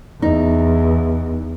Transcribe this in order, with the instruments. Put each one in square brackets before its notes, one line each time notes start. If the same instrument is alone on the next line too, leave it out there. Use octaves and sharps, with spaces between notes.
[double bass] E2 [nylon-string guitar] D#4